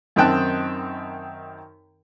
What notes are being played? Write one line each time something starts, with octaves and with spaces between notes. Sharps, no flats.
F#2 D#3 C4 G5 A5 F#6